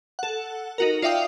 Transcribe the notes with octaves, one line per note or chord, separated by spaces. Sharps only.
A4 F#5
D#4 F#4 A#4
F4 D5 E5 F5 G5 D#6